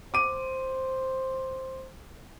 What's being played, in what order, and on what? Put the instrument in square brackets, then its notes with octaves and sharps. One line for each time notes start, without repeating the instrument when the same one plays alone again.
[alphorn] C5 [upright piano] D6 D#7